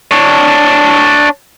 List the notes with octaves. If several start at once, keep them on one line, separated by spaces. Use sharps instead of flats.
D4 C#5